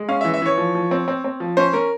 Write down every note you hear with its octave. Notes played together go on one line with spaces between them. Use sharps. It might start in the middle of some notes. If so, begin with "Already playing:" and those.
Already playing: G#3
C#4 F5
E3 E5
E5
E3 C#5
F3
F3
C4
C4
C4
F3
C#4 C5
C#4 A#4